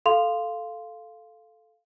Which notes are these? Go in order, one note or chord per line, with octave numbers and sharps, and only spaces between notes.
A4 F5 C6 F7